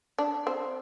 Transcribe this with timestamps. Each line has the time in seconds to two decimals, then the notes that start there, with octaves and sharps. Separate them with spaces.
0.18 D4
0.47 C4